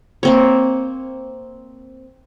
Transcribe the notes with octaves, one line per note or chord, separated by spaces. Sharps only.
A#3 C4 C#5